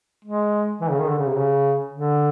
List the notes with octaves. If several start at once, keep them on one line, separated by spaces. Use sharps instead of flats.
G#3
E3
C#3
D#3
D3
C#3
C3
C#3
D3